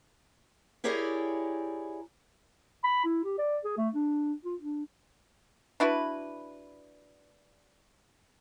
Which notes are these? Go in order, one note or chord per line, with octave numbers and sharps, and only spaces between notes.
E4 G4 G#4 A#4 C#5 D5
B5
E4
G4
D5
G#4
A3
D4
F4
D4
D4 E4 F#4 B4